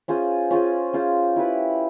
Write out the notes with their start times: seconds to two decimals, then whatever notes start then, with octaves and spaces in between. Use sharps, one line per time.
0.08 C#4 F4 G#4 C5
0.51 C#4 F4 G#4 C5
0.93 C#4 F4 G#4 C5
1.36 E4 G4 B4